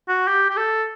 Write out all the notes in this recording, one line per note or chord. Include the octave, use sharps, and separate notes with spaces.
F#4
G4
G4
A4